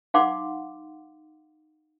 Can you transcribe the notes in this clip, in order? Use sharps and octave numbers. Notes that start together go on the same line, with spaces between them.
D#4 F5 F#5 C6 D6